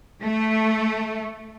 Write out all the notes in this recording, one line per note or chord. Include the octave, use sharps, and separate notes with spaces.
A3